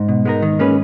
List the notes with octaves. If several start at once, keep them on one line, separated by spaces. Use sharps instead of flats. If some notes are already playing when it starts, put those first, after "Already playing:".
Already playing: G#2
B2
G#3 B3 D#4 A#4
D#3
A#3 C#4 G#4 B4